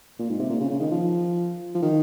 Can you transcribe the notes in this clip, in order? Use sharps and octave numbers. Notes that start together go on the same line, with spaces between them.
A#2
G#2
C3
A#2
C#3
C#3
D#3
F3
F3
D#3